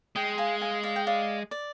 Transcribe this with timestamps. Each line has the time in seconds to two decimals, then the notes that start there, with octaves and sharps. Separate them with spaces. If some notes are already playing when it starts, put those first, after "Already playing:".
0.16 G#3 D#5 G5
0.38 F5 G#5
0.61 F5 G#5
0.83 D5 F5
0.96 G5
1.07 D5 F5
1.51 D5